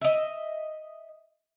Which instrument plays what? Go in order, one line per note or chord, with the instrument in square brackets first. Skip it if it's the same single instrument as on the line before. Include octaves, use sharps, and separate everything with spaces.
[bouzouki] D#5 E5